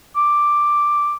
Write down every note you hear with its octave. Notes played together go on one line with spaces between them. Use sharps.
D6